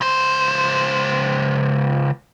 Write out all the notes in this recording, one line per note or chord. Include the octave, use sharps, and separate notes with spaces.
C#2 C5